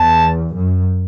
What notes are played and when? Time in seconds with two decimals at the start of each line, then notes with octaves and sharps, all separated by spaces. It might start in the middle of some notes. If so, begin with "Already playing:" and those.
Already playing: E2 A5
0.55 F#2